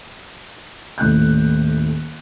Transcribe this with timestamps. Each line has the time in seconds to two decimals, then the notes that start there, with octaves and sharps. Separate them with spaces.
0.98 D#1 A2 F#6 G6